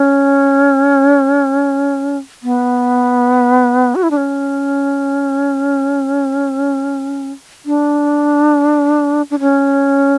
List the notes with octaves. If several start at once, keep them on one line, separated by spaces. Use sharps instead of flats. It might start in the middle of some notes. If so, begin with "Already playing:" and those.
Already playing: C#4
B3
F#4
E4
D4
C#4
D4
D4
C#4